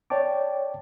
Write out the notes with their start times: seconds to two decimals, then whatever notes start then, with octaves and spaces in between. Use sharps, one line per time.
0.10 C#5 D5 G5 A5 D6